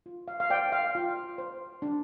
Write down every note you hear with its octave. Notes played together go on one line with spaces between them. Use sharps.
F4
F5
F5
C5 D5 G5
F5
F4
C5
D4